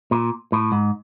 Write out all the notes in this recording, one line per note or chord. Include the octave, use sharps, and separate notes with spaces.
A#2
A2
G#2